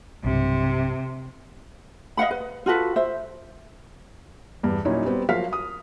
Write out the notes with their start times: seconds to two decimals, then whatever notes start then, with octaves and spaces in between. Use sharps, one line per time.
0.24 B1 G2 C3
2.17 D#5 F5 F#5 B5
2.31 B4
2.66 F4 F#4 A4 B4
2.96 C5 E5
4.63 E2 G2
4.85 A#2 F#3 C#4 D#4 E4
5.05 G3 B3 C4
5.29 F3 F#3 A#4 F5 F6 B6
5.53 D#6